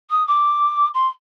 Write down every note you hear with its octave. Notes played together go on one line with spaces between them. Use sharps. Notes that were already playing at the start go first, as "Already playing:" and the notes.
D#6
D6
C6